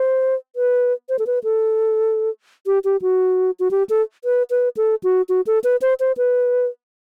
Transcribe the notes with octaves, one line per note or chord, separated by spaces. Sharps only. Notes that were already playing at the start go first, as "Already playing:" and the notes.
Already playing: C5
B4
C5
A4
B4
A4
G4
G4
F#4
F#4
G4
A4
B4
B4
A4
F#4
F#4
A4
B4
C5
C5
B4